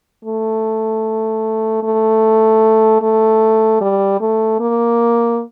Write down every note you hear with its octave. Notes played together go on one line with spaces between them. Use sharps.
A3
A3
A3
G3
A3
A#3